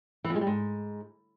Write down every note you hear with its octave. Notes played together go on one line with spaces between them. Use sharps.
E3
F2
G#3
G3
G#2